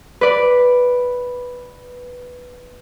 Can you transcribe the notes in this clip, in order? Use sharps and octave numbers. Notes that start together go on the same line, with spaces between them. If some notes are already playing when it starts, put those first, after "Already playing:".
B4 D5